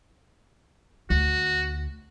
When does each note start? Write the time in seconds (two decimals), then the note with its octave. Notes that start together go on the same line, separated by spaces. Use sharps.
1.10 D2 F#4